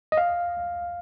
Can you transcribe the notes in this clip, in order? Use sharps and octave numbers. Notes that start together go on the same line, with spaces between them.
D#5
F5